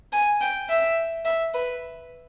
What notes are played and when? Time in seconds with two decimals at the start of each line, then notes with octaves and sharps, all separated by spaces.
0.13 G#5
0.41 G5
0.69 E5
1.25 E5
1.54 B4